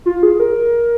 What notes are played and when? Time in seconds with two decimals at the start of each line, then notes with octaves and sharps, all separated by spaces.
0.06 F4
0.23 G#4
0.40 A#4